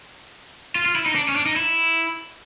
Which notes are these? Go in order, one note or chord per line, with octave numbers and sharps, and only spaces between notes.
F4
F4
E4
D#4
D4
C#4
D4
D#4
E4